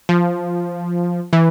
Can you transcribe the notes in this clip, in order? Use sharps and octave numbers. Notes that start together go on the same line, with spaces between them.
F3
E3